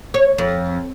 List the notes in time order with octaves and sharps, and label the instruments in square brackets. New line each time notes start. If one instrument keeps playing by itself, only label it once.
[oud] C#5
F2